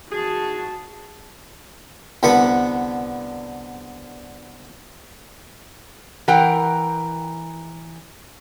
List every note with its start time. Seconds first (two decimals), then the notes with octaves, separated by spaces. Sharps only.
0.10 F#4 G#4 A5
2.23 C2 D3 B3 B4 F#5
6.28 E3 A#4 F#5 G5 A#5